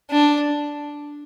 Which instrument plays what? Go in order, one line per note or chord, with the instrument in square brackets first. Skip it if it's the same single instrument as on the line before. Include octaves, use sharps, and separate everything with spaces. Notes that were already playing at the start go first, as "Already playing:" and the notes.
[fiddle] D4